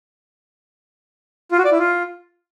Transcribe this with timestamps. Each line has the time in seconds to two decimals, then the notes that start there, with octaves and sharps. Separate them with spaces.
1.51 F4
1.58 F#4
1.65 D5
1.72 E4
1.79 F4